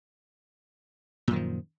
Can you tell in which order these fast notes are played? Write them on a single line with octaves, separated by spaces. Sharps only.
A#2 F#2 D#3 F3